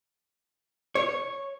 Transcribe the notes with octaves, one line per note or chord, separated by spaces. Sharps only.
C#5